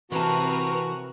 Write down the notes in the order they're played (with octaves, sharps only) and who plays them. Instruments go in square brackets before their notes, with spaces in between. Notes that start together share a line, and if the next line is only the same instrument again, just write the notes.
[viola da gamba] C3 C4 [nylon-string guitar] E3 A5 [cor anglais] F#4 [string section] A#4 B4 F6